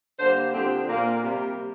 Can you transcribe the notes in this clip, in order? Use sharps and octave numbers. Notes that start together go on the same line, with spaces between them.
D3 G3 A#3 C5
D3 F3 C4 G4
A#2 A#3 A#4
C3 G3 A#3